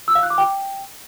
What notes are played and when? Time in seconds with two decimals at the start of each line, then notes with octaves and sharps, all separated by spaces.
0.08 E6
0.15 F5
0.23 F#6
0.30 D6
0.38 G5